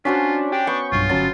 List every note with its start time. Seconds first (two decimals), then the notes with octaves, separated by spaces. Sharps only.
0.05 C#4 D4 F4 F#4 C5 B6
0.52 D4 G4
0.67 B3 G5 C#6
0.92 B1 G2 F4
1.09 G1 F#3 C#4 A5 C6 A6